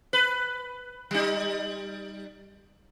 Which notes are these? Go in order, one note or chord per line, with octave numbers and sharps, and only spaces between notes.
B4
G3 D#4